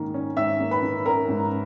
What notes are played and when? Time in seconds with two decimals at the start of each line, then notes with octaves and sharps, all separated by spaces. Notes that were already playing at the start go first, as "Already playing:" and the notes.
Already playing: G#2 D#3 A#3 C#4
0.14 C#4
0.37 G#2 E5 E6
0.60 A#3
0.71 B4 B5
0.82 D#3
1.05 C#4 A#4 A#5
1.29 G#2